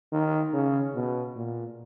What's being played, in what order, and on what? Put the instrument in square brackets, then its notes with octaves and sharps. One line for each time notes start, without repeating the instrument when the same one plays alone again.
[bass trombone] D#3
C#3
B2
A#2